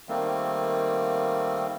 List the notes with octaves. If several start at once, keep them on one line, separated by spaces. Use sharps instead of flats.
D#3 G3 A3 A#3 C4